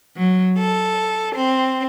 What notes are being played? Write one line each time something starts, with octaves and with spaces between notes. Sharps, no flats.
F#3
A4
C4